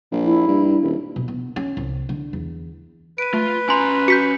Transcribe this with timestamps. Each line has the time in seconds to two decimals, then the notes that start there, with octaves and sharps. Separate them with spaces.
0.12 A#1
0.24 E4
0.48 G2
0.82 D#1
1.16 B2
1.28 B3
1.56 C#4
1.77 C2
2.09 D3
2.33 E2
3.18 B4 D7 D#7
3.34 A3 F4
3.69 C#4 G#5 A#5 C6 F7
4.08 F#4 G6 B6 C#7